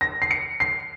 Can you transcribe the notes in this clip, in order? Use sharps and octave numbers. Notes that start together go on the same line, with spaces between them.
A#6
C7
C#7
C7